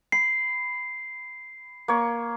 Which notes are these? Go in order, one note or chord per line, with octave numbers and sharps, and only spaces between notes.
B5 C7
A#3 C#5